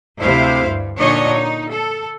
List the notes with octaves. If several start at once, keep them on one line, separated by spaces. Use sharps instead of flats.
D2 C3 E4 C5 F5
G2
A#2 D3 D4 D#4 C#5 D#5
D#4
A4